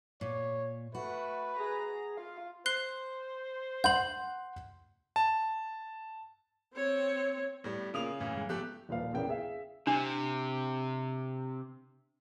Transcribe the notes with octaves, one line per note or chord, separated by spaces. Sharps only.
A#2 C#5
A3 F#4 B4
G#4 A#5
F4 F5
C5 F#6 C7 G7
F#5 C6 G6 F#7
A5
C4 C#5
A2 G3 B3
C#3 A#3 F4 A#4 D#6 F7
F#2 A2 C#3 E3
G#3 A3
F3 A3 B3 G4 F#6
D#1 A#2 F3 B4 F5
A#1 E2 C#3 B3 A#4 G5
G#4 E5 F5
C3 D4